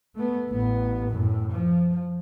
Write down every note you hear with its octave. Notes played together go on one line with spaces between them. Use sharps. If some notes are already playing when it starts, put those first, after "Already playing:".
A3 B3
A1 B3
F#2 A2
F3